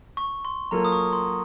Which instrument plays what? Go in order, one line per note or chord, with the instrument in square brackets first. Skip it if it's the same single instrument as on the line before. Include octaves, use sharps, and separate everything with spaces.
[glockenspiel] C#6
C6
[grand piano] F#3 A#3 F4 A4 [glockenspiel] A#5
[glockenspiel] D#6
C#6
C6